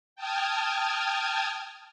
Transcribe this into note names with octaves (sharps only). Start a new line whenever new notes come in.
G5 A5 D#6 F6 G#6